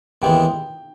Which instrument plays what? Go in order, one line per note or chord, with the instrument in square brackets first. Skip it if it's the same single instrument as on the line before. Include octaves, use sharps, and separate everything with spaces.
[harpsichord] D#2 C#3 E3 G#3 B3 [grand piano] G5